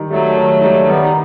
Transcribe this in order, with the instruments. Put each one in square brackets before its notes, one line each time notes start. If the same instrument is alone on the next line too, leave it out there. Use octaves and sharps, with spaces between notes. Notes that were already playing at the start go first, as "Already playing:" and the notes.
Already playing: [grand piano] D#3 G3 D#4
[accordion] F#3 A3 [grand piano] G3 D#4
[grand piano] D#3
G3 D#4
[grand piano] D#3 [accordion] G3 B3
[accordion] D#4